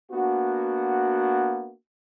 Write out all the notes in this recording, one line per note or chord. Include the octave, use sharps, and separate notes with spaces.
A#3 B3 D4 F#4